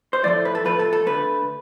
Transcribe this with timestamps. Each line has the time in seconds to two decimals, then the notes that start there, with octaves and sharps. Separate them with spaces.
0.13 C5
0.23 A2 F3 A3 D5
0.45 B4
0.55 A4
0.65 A2 F3 A3 B4
0.79 A4
0.93 A4
1.06 D3 A3 B4